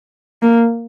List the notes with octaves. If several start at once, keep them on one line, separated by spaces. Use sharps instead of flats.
A#3